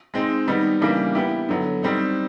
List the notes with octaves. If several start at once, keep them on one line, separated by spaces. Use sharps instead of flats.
G#3 C4 D#4
D#3 G3 B3 D#4
C#3 E3 G3 A#3 D4
B3 E4 G4
D3 F#3 B3
G3 C4 D#4